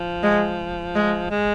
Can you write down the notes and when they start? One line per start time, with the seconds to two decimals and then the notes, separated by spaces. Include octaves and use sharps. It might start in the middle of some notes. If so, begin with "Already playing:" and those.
Already playing: F3
0.23 G#3
0.95 G#3
1.30 G#3